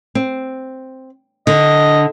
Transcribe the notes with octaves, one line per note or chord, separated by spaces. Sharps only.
C4
D3 D#5